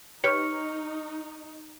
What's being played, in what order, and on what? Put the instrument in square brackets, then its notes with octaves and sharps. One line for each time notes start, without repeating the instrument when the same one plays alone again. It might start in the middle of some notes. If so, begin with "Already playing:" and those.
[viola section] D#4 [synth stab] G4 B4 C#5 [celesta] C#6 F6 C#7